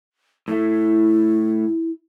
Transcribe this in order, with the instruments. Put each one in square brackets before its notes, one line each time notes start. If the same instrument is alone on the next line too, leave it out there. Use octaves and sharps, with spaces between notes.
[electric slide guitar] A2 A3 [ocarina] E4